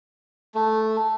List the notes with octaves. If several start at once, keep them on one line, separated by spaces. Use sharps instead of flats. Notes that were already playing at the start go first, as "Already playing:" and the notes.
A3